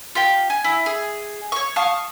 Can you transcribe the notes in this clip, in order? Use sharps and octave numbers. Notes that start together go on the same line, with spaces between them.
F4 G4 G5
G#5
E4
G#4
C#5 C#6
F5 A5 C#6 D#6